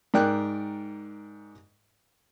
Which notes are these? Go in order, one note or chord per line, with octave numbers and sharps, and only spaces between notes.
G#2 A#4 D5 G5 F#6